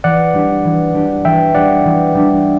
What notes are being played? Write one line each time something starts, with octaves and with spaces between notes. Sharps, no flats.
E3 D5 F#5
G3 D4 G4
E3
G3 D4 G4
E3 E5 G5
G3 D4 G4 D5 F#5
E3
G3 D4 G4